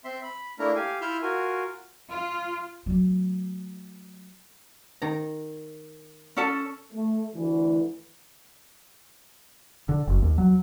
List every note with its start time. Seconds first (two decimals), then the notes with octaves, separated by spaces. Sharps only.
0.05 C4 E5 C6
0.23 B5
0.59 A3 A#3 D4 E4 A#4 A#5
0.75 G4 F5 G#5
1.01 E4 F4 E5 E6 F6 G6
1.22 F4 F#4 A#4 G#5
2.09 F4
2.86 F#3 A3
5.02 D#3 A#5
6.37 C#4 A4 A5
6.93 A3
7.35 D2 E3
9.89 D3
10.07 F#1
10.22 D#2
10.38 F#3